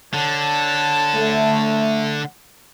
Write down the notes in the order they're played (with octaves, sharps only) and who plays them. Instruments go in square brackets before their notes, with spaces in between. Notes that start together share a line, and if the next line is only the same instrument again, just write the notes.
[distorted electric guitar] D3 [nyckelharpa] C#5 A5
[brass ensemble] A3